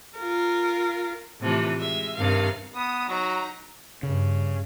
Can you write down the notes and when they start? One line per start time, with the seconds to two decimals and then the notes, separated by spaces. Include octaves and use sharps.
0.19 F4 A#4
1.40 A2 C3 E3 F3
1.78 G#3 E5
2.16 G2 C3 D#3 F5
2.75 B3 D#6
3.09 F#3 D#4 A#5
4.03 G2 C#3